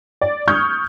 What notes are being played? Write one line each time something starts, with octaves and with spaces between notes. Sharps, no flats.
D5
C#6 D#6 F6 G6 G#6